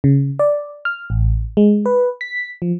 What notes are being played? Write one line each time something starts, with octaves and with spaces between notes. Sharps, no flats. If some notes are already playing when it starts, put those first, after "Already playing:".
C#3
D5
F6
A1
G#3
B4
B6
F3